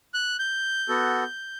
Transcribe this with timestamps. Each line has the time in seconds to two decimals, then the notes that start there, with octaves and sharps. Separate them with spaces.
0.14 F#6
0.39 G6
0.89 B3 F#4 A4